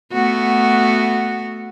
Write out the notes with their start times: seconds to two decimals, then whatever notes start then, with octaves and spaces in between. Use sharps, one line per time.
0.12 A3 B3 F#4